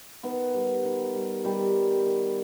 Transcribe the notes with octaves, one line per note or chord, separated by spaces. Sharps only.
D#3 B3
G3
D#3
G3
D#3 G3 G4
G3
D#3